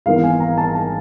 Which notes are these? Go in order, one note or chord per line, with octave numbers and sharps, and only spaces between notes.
G#1 G#2 E3 G#3 B3 F5
G#5
A#5
A5
A5